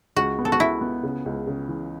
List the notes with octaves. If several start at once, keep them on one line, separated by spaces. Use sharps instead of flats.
C#2 F#4
B3
A4
F#4
B3 E4
B3
C#3
C#2
C#3
E3